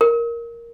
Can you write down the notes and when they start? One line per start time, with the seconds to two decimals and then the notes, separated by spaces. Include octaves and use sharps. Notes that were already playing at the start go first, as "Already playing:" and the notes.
0.01 A#4